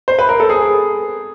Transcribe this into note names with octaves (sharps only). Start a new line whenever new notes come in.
C5
B4
A#4
A4
G#4